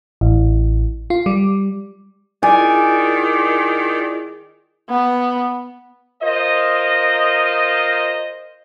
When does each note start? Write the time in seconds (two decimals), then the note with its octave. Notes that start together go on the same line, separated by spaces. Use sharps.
0.21 A1
1.10 F4
1.26 G3
2.43 D#3 E4 F4 G#4 D5 G#5
4.90 B3
6.23 F4 A#4 C5 D#5